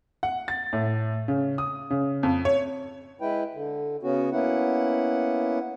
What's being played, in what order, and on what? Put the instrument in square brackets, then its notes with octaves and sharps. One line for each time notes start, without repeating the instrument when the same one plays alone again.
[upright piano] F#5
A6
A2
C#3
D#6
C#3
F2
C#5
[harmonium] G#3 E4 B4 G5
D3
C#3 B3 C#4 F#4
A#3 B3 C#4 E4 F#5